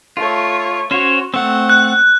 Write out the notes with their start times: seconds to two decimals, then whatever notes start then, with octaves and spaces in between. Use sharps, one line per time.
0.17 A3 F4 C#5
0.91 C#4 F#4 C5 C#5
1.34 A3 C4 F#5
1.70 F#6